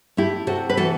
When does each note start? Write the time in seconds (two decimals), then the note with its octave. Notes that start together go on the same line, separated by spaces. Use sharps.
0.17 A3 E4 G4
0.47 C3 F#4 A4
0.70 B4
0.77 E3 F#4 A4